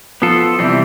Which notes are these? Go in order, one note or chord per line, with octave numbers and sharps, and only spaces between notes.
F3 B3 F4 A4
C3 E3 G3 C4